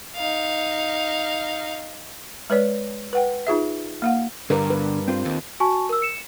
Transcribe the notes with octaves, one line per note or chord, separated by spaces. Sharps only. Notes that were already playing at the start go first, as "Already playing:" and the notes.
D#4 F5
G#3 B4 C#5 D5
B4 F#5 G5
D#4 F4 G#4 E5
A#3 F5 F#5
G2 D3 A#4 B4
B4
C4 F4 C5
D#2
F#4 G#5 A5 C#6
A#4 E6
C#7 E7